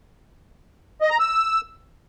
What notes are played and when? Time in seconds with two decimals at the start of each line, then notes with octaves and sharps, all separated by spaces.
1.01 D#5
1.10 A#5
1.19 E6